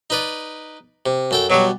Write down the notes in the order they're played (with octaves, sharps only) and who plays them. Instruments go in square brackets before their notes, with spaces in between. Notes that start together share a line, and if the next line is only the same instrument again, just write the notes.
[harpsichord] D#4 B4 D5
C3
F#2 A4 G5
[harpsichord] B2 G3 [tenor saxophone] F#3